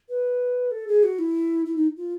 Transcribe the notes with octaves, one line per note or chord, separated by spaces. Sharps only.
B4
A4
G#4
F#4
E4
E4
D#4
F4